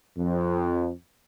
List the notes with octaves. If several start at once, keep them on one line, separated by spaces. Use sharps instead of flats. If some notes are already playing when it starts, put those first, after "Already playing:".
F2